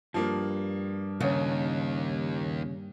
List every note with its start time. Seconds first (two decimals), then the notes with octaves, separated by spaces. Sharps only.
0.14 G2 F3 A#3
1.20 D#2 C#3